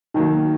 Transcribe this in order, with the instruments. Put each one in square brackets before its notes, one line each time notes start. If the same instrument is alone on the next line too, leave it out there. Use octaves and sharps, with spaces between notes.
[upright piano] D#3 F#3 A#3 [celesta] D#4